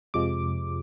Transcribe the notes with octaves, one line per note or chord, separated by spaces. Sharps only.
F2 C3 F3 G#3 D6